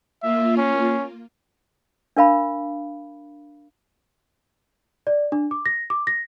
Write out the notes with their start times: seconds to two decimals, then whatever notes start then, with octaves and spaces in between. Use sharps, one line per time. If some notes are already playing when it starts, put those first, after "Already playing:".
0.22 A#3 F4 E5
0.57 C#4
2.17 D4 A#4 F5 B5
5.07 D5
5.32 D4
5.51 D6
5.66 A#6
5.90 D6
6.07 A#6